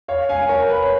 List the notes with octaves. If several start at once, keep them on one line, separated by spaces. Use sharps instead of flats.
C#5 F5
F5 G#5
A#4 C#5
B4
C#5